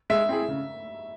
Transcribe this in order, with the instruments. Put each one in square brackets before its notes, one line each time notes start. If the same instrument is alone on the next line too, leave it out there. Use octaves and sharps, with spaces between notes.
[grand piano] G#3 [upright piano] E5
[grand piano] C4 E4 G#4
C#3